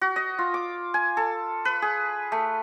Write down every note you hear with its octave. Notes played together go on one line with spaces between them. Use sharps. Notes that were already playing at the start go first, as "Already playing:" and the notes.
F#4
D#5
F4
D6
G#5
A4
B4
G#4
A3